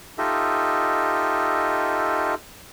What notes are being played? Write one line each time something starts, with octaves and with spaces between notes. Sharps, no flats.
D#4 F4 G4 A4 D#5 E5